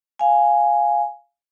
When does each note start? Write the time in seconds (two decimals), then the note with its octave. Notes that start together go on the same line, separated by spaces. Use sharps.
0.19 F5 G#5